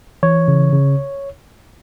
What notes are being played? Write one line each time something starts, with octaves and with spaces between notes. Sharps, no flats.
E3 C#5
C#3
C#3